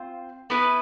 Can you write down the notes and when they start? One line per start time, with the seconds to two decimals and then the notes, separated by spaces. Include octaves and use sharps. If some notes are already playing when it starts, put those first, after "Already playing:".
Already playing: C4 F4 C5
0.50 B3 E4 B4